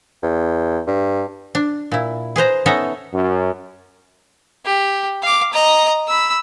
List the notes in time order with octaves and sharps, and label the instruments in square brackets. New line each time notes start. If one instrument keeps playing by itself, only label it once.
[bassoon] E2
G2
[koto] D4
A#2 E4
G#4 B4 C5 A#5
B3 C#4 D#4 A4 E5 A#5
[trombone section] F#2
[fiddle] G4
F5 D6
D#5 A#5
B5 E6